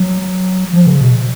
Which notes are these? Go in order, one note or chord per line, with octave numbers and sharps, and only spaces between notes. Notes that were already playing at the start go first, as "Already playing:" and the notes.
Already playing: F#3
F3
C#3
B2